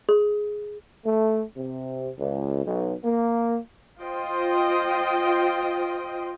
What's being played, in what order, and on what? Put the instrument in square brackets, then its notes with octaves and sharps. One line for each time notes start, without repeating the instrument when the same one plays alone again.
[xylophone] G#4
[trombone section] A3
C3
C#2
B1
A#3
[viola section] F4 C5 D#5 G5